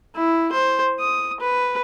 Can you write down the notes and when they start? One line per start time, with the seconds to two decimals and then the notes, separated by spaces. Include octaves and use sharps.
0.16 E4
0.52 C5
1.00 D#6
1.40 B4